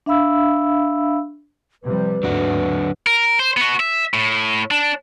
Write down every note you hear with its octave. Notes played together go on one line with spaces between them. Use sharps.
D4 E5 F5 B5 E6
C3 F3 G3 B4
D#2 G#2 D3 F#3 D4 F#4
A#4
C5
B3 F#4
E5
A2
D4